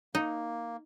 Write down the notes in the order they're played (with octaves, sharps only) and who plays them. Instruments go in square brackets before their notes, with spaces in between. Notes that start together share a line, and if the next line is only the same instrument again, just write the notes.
[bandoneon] A#3 [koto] D#4